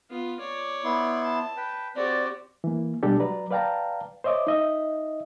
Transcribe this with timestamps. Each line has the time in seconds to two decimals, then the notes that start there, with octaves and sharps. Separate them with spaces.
0.10 B3 F4
0.39 C#5 D5
0.84 B3 E4 C6
1.23 A5
1.57 B4 G5
1.96 C4 F#4 G4 D5
2.64 E3 A#3
3.03 B2 G3 G#3 D4 G4 A4
3.20 F#3 B4 D5 A#5
3.51 B4 D5 F5 G5 A5 A#5
4.24 C5 C#5 D#5 E5 D6
4.47 D#4 D#5 E5